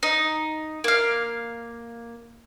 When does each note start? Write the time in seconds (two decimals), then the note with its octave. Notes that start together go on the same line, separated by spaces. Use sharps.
0.03 D#4
0.84 A#3 F5